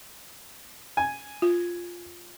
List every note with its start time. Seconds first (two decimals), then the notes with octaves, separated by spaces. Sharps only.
0.97 G#5
1.42 F4